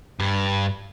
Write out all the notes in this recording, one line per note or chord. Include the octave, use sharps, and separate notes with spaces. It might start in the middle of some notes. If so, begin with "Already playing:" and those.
G2